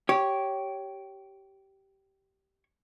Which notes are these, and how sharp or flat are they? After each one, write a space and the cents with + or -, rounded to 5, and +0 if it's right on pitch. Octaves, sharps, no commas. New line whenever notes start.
G4 -15 C#5 +0